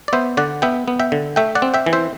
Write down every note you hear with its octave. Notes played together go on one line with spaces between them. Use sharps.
D5
B3 C5 E5
D3 D5 F#5
B3 E5 G5
B3
E5 G5
D3
A3 E5 G5
D5 F#5
C4
E5 G5
E3
C5 E5